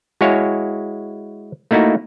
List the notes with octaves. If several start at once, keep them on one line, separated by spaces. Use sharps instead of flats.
G#3 E4 F#4 G#4 C#5 F5
A3 A#3 D#4 E4 F#4